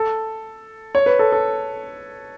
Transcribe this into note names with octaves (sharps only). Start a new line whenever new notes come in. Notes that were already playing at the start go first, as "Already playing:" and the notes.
Already playing: A4
C#5
B4
A4
A4